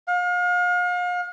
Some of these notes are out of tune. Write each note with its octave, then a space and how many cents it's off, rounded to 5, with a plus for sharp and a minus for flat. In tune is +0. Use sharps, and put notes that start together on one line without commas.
F5 +40